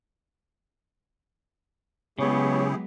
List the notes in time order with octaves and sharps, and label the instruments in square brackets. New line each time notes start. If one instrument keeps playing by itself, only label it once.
[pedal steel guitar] C#3 [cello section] F#3 G#3 B3 [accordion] E4 G4 G#4 [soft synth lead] C#5